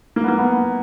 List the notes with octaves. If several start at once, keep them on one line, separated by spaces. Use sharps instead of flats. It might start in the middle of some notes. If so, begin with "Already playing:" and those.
A#3
B3
A#3
B3